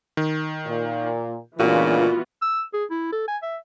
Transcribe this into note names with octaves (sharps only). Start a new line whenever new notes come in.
D#3
A#2
A#2 C#3 E3 G#3 B3 D4 F4 F#4
E6
G#4
E4
A4
G#5
E5